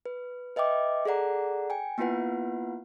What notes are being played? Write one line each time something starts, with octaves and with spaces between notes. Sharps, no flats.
B4
B4 D#5 E5 G5 D6
G#4 A4 D5 F#5 A#5
G5 G#5
A#3 B3 E4 F4 B4 F#5